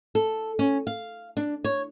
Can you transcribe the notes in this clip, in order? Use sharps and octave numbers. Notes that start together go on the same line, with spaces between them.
A4
C#4
F5
D4
C#5